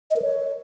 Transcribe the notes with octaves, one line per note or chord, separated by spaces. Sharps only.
D#5
A#4
C#5